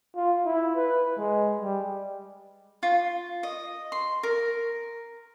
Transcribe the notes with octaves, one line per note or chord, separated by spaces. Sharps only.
F4
E4
B4
G#3
G3
F4
D#5
C6
A#4